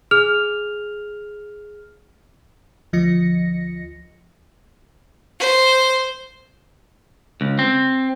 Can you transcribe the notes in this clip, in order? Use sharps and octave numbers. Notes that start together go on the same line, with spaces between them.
G#4 F6 F7
D2 F3 D#5 A#6 C#7
C5
C#2
C4